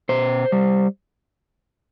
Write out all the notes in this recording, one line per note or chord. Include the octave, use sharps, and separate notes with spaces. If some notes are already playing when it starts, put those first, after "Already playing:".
B2 C5
G3